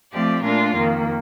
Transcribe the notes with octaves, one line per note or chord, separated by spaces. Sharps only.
F3 A3 C4 G4 D5
A#2 A3 D4 F4 A#4
F2 D#3 A#3